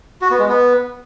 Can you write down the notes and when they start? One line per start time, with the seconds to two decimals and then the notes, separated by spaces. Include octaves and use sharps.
0.22 F#4
0.30 B3
0.39 G#3
0.48 B3